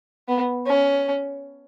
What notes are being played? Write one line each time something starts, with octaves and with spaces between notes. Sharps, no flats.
B3
C#4